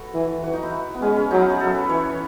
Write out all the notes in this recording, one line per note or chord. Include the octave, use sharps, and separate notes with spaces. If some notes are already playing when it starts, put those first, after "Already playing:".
Already playing: F#4 A4 B4 C#5
E3
E3 F#4
D#4
E4
B3
G#3 C#4
C#4
F#3 D#4
E4
G#4
F#3 A4
B4
E3 C#5
C#5